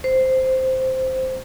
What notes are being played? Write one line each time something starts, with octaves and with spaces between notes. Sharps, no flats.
C5